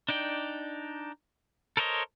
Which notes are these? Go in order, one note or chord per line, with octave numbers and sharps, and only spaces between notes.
D4 D#4 D5 G5
A4 A#4 C5 C#5 D#5